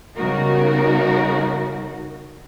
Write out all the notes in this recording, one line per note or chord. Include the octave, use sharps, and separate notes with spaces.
C#3 G3 B3 D#4 F#4 A#4